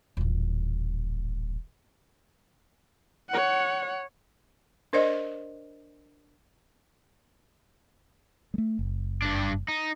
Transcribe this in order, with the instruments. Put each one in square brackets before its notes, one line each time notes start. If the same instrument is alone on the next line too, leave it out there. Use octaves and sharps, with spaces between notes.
[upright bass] D#1 A1
[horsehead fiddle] C#5 F#5
[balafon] D4 A#4 C5 D5 D#5
[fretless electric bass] G#3 A3
F#1
[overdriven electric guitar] G2 D4
D#4